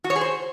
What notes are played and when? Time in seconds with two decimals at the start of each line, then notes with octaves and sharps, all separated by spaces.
0.04 F#4
0.10 C#5
0.16 G#4
0.21 C5